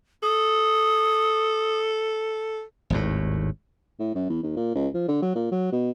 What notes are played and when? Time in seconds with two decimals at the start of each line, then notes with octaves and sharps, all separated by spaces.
0.23 A4 D#6
2.90 G#1 D#2 A2
3.99 A2
4.15 F#2
4.29 E2
4.43 D#2
4.56 A#2
4.75 C#2
4.94 F3
5.08 D3
5.22 F#3
5.35 A#2
5.51 F#3
5.72 B2